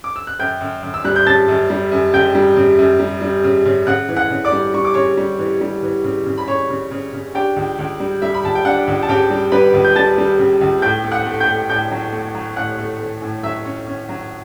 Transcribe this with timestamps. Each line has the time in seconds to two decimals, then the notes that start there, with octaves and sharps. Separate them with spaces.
0.04 D6
0.16 E6
0.27 F#6
0.39 F#2 G5 G6
0.61 F#2
0.83 F#2
0.94 E6
1.04 G3 F#6
1.16 G6
1.26 C#3 A5 A6
1.48 F#2
1.70 G3
1.92 F#2
2.13 C#3 G5 G6
2.35 G3
2.56 C#3
2.79 F#2
3.00 G3
3.22 G3
3.44 C#3
3.66 C#3
3.87 C#3 F#5 F#6
4.09 E3
4.16 F#5 F#6
4.31 C#3
4.45 D5 D6
4.52 G3
4.74 G3 C#6
4.85 D6
4.94 C#3 C#5 C#6
5.17 G3
5.39 E3
5.61 G3
5.83 E3
6.04 C#3
6.26 C#3
6.38 B5
6.48 C#3 C#5 C#6
6.69 C#3
6.91 C#3
7.13 C#3
7.34 D4 G4 G5
7.56 C#2
7.79 C#2
8.00 G3
8.22 G3 E5
8.34 B5
8.43 C#2 A5
8.55 G5
8.65 D4 F#5
8.87 C#2
9.03 A5
9.08 C#3 G4 G5
9.30 G3
9.52 G3 B4 B5
9.74 C#2
9.84 G6
9.96 G3 A5 A6
10.18 G3
10.39 C#3
10.61 C#2
10.82 A2 G5 G6
11.04 A3
11.12 F#5 F#6
11.26 A3
11.40 G5 G6
11.47 A3
11.69 A2 G5 G6
11.91 F#3
12.12 A3
12.35 F#3
12.56 A2 F#5 F#6
12.78 A3
12.99 A3
13.22 A2
13.43 F#3 E5 E6
13.65 C#4
13.87 C#4
14.09 F#3